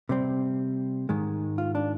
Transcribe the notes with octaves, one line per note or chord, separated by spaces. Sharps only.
C3 G3 C4
G#2 D#3 G#3
F4
D4